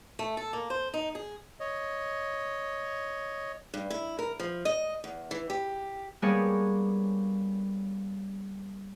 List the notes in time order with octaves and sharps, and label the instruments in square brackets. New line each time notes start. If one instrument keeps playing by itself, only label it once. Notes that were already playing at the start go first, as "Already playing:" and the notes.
[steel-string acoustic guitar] A3
A4
A#3
C5
D#4
G#4
[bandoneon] C#5 D#5
[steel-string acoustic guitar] G2
E4
A#4
F3
D#5
E2
E3
G4
[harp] G3 A#3 B3 D4 G#4 C#5